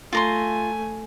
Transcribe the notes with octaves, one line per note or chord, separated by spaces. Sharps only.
A3 F4 G#5 A#5 C6